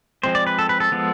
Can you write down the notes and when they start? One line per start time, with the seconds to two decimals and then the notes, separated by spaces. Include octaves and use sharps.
0.23 F3 G#3 C4 C5
0.35 D5
0.47 B4
0.59 A4
0.69 B4
0.80 A4
0.92 F3 G#3 B3